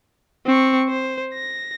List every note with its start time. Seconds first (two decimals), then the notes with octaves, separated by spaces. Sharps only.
0.46 C4 C#6
0.89 C5
1.34 A#6